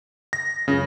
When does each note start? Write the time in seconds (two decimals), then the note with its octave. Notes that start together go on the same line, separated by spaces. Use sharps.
0.33 A#6
0.68 C#2 F#2 C#3